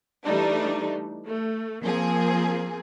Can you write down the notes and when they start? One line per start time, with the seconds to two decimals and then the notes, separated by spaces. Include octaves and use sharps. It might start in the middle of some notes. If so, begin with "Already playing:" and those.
0.25 E3 G3 A3 D4 D#4
1.25 A3
1.83 F3 A#3 C4 G#4